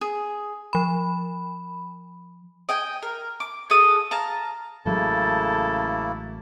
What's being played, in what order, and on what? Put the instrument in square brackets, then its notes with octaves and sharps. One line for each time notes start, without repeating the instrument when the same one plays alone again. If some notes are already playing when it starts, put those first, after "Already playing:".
[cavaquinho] G#4
[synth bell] F3 B5
[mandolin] D#5 G5 G#5
A#4
D6
F#4 G#4 A4 D#6
F5 A5 A#5
[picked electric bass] A1 F#3 G#3 [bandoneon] C#3 A#3 E4 [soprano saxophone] A4 [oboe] A5